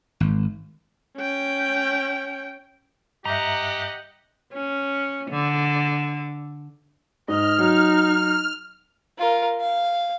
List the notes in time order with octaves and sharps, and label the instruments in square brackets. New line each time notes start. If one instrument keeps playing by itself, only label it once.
[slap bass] G#1
[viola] C#4 G5
[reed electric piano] G2 E5 [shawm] G4 [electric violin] D#5 F#5 [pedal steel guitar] A#5
[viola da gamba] C#4
D3
[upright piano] G#2 [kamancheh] D#5 [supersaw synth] F6
[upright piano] F#3 [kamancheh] D#4
[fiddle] F4 A#4
F5